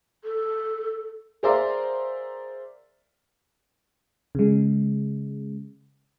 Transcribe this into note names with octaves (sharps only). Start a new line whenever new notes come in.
A4
G#4 A#4 C5 D5 E5 F5
C#3 G#3